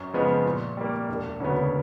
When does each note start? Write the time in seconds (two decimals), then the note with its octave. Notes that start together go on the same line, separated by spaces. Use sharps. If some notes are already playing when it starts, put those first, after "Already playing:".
Already playing: F#2
0.13 C#3 F3 G#3 B3
0.46 A#2
0.77 G3 A#3
1.09 E1
1.40 D2 C#3 F#3 B3